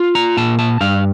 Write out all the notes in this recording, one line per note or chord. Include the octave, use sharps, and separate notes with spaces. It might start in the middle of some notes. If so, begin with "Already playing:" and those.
Already playing: F4
A#5
A#2 A5
A5
G2 F5